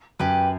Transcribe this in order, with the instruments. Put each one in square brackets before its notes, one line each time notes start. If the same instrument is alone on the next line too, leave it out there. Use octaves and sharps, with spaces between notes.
[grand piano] F#2 [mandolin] G4 B4